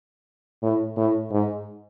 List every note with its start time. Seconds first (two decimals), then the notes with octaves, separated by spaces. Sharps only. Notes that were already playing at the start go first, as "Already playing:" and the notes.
0.62 A2
0.97 A2
1.32 G#2